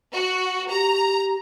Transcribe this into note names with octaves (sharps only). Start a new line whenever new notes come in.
F#4
G4 A#5